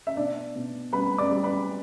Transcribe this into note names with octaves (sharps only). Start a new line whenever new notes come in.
E5
B2 D4 D5
B2
G3 B4 B5
D5 D6
G3
B4 B5